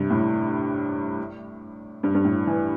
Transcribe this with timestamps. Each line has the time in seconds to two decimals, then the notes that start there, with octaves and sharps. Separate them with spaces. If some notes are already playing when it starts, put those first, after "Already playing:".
Already playing: G2 C3
0.10 A2
2.03 G2
2.15 G2
2.25 A2
2.47 E3